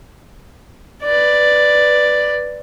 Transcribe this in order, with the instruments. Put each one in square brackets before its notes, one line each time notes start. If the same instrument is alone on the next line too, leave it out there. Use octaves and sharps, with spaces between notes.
[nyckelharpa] B4 D5